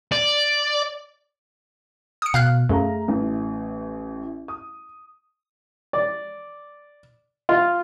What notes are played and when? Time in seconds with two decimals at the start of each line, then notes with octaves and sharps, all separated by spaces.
0.12 D5
2.22 D#6 C#7
2.34 B2 F5 F6 F#6
2.69 F#2 A3 G#4 F5 A#5
3.08 A1 A2
4.48 D#6
5.93 D5
7.49 F4